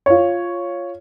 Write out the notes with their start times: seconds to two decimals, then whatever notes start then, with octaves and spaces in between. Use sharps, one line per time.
0.06 F4 C#5